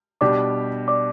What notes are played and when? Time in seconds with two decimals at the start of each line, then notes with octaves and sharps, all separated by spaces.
0.21 B2 G3 D4 G4 D5 D6
0.88 D5 D6